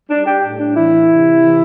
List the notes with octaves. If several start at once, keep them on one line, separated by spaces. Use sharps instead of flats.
G3 D4
G4
A2
D4
E3 E4
C3
E3